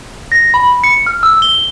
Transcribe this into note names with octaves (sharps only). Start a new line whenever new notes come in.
A#6
B5
C#7
F6
E6
G7